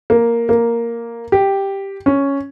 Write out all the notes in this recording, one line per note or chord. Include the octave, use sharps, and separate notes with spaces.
A#3
A#3
G4
C#4